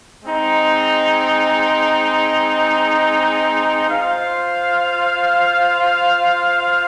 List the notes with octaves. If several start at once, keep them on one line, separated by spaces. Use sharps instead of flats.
G#3 C4 D#4
F4 C5 F5